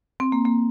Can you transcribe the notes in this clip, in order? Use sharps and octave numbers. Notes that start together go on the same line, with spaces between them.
C4
A#3
A#3